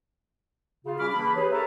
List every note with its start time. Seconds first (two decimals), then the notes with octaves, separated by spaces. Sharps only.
0.85 C#3 F4
0.99 G3 C#4 F#4 B5 D6 F6
1.12 E3 A#3 D4 G#4 B5
1.36 G4 G#4 B4 C#5
1.52 A4 A#4 C#5 E5 A5 A#5